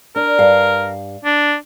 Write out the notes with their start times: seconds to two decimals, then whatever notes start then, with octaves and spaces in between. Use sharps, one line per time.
0.16 D4 A#4
0.39 G2 F5
1.25 D4